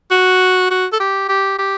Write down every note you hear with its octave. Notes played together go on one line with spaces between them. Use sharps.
F#4
F#4
A4
G4
G4
G4